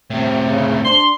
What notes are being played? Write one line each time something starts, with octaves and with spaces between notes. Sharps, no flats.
A2 C3
C#3
D4 C6